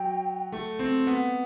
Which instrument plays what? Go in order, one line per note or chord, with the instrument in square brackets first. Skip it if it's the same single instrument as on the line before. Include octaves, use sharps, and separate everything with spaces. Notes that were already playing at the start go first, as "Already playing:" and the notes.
Already playing: [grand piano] F#3 [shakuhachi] G5
[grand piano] A3
C4
B3